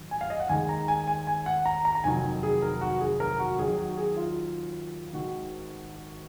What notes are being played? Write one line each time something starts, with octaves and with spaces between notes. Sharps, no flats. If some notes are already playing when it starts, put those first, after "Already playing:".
Already playing: G#2 D#3 F#3
G#5
F5
D#5
F#5
D#2 D#3 G#3 D#4 G#5
A#5
G#5
G#5
G#5
F#5
A#5
A#5
A#5
F1 D#2 D#3 F#3 G#5
G#4
A#4
F#4
G#4
A#4
F#4
D#2 D#3 F#3 G#4
F#4
G#4
F4
G#1 G#2 D#3 F#4